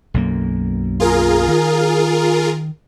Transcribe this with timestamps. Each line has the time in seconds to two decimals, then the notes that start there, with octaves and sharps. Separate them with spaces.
0.14 B1 F#2 A#3
1.00 F4 G#4 A#4
1.48 D#3